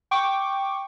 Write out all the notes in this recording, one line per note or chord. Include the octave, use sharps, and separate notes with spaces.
G5 C#6 D6